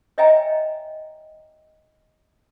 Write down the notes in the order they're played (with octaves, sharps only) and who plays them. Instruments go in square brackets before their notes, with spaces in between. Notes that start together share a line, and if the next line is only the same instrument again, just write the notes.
[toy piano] C#5 D#5 E5 G5 G#5 A#5